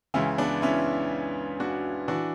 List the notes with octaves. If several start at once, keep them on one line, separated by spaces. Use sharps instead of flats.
C#2 C#3 E3 C#4 E4
B3 D4
C#4 E4
D4 F#4
E3 D4 F#4